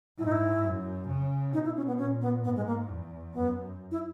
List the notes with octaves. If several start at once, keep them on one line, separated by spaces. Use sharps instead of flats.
G#2 E4
D#4
E4
F#2
C#3
B2 D#4
E4
C#4
B3
A#2 C#4
B3
G#2 B3
G#3
A#3
E2
F#2 B3
E4